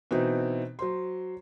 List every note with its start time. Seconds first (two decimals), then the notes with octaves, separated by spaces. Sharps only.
0.11 B2 E3 C4 D#4
0.79 F#3 C5 C6